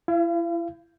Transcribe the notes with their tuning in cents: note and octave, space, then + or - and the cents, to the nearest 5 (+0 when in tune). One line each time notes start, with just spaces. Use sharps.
E4 +35 F5 -35